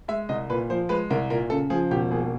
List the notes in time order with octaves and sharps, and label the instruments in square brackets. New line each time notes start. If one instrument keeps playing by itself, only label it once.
[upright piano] G#3 E5
C2 D#5
A#2 B4
F3 C5
G#3 B4
C2 A#4
A#2 A#4
C#3 A4
F3 G#4
E1 G4
D#2 G#4